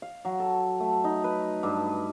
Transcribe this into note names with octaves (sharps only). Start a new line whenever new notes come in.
F5
F#3
A4
A3
D#4
B4
G2
B4